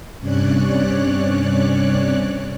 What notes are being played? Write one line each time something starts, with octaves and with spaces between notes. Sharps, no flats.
G2 C3 C#4 C#5 D5 F#6